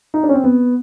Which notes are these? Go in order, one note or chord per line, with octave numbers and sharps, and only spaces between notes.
D#4
D4
C#4
C4
B3